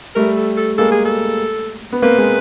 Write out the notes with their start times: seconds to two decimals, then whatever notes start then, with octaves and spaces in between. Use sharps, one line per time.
0.15 G3 A3 A#4
0.37 A4
0.57 A4
0.78 G#3 A#3 A4
0.92 G#4
1.05 A4
1.93 B3
2.02 A#3 C4 B4
2.18 G#3 A#3